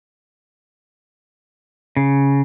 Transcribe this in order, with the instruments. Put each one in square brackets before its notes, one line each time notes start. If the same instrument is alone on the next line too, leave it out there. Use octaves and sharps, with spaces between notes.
[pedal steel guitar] C#3